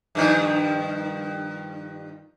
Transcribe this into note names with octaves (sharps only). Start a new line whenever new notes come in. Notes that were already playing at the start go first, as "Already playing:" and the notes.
G2 D#3 F3